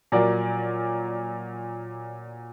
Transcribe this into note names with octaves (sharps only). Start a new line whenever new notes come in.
A#2 F#3 A#4 D5